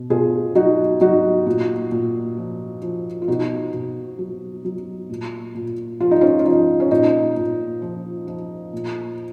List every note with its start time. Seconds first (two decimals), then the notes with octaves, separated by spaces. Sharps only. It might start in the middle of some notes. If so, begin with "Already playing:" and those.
Already playing: B2
0.10 B2 F4 G#4
0.55 F#3 D#4 F#4
1.01 F#3 D#4 F#4
1.46 A#2
1.92 A#2
2.37 F3
2.82 F3
3.22 F4
3.28 B2 D#4 F#4
3.74 B2
4.19 F#3
4.65 F#3
5.10 A#2
5.55 A#2
6.00 F3 F4
6.11 D#4
6.21 C#4 F4
6.39 F4
6.45 F3 D#4
6.80 C#4
6.91 A#2 D#4
7.37 A#2
7.82 F3
8.27 F3
8.73 A#2